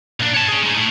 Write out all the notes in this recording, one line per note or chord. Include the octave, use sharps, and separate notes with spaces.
A#2 D4
C#5 A5
C#4 G#4
G#3 D#4
A2